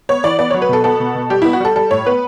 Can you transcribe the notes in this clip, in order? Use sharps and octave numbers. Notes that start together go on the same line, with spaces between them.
B3 C#5
E3 D5
B3 D5
F#3 C#5
B4
B2 A4
B3 A4
B2
B2
G3 G4
B3 E4
F#4
G3 A4
G3 A4
A2 C#5
B3 B4